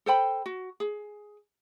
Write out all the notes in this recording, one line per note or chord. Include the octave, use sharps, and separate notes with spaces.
A4 C5 G5 B5
F#4
G#4